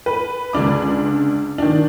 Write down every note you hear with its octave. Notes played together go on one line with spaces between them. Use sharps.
B4
C#2 D3 D4 D6
D#3 D4